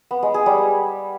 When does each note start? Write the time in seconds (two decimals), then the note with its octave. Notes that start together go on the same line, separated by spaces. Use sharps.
0.11 B3
0.23 G#3
0.34 G#4
0.46 G3